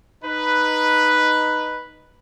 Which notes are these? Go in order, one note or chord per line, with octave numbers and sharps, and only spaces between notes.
D#4 B4